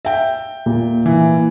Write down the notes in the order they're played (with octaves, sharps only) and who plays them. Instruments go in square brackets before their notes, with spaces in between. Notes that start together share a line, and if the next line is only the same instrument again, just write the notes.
[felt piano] E5 G5
[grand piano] A#2
[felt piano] E3